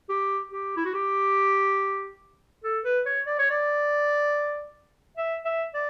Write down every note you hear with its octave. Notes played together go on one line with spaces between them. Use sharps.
G4
G4
E4
F#4
G4
A4
B4
C#5
D5
C#5
D5
E5
E5
D5